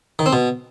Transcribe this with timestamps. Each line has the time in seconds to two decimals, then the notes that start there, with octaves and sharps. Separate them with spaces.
0.19 D#3
0.26 C4
0.33 B2